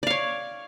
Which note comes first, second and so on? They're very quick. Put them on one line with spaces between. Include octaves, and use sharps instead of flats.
D5 F5 C#5